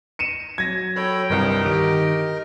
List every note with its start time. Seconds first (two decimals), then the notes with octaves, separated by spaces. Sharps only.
0.19 C#7 D#7 E7
0.58 F#3 G#6 A#6
0.96 A4 C#5 G5 B5
1.30 G1 C2 G2 A#4 D#5
1.66 D#3 G4 D7